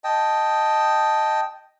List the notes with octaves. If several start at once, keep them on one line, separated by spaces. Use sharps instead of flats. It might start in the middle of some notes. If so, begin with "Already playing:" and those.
D#5 G5 A5